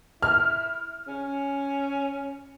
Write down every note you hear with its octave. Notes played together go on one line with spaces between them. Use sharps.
E4 F6
C#4